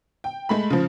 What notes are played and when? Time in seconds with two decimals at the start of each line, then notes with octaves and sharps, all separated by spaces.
0.24 G5
0.49 G#3 A3 B5
0.70 C#3 F3